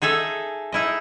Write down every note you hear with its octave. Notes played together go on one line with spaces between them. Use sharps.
D#4 G#4 A4 E5
D#4 E4 D#5